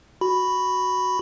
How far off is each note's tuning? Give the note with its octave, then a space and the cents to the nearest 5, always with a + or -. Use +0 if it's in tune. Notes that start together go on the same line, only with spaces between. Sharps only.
F#4 +0 B5 +0